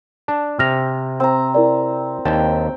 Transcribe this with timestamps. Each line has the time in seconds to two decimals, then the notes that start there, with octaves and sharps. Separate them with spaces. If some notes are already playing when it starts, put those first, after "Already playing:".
0.28 D4 A5
0.59 C3 F6 A#6 F7
1.20 C4 A#5
1.54 E4 A#4 D5
2.25 D#2 G5 A5